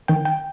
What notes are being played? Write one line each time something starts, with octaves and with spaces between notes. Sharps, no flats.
D#3 G5
G5